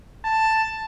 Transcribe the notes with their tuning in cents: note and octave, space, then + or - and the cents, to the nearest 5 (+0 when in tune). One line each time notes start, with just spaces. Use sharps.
A5 +5